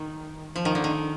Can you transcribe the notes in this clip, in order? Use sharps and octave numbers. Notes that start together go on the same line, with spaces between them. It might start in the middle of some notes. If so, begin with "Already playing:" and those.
Already playing: D#3
F3
D#3
D3
D#3